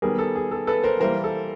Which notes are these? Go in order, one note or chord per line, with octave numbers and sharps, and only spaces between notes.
D#3 G3 B3 G#4 A#4
A4
G#4
A4
A4 B4
A#4 C5
E3 G3 A#3 A#4 C5
A4